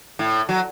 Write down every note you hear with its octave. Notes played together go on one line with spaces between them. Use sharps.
A2
F#3